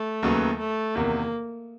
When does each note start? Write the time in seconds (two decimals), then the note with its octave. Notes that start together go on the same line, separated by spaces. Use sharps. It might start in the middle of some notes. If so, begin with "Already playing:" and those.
Already playing: A3
0.23 D#2 C#3 F#3 B3
0.59 A3
0.95 E2 C3 D#3 A#3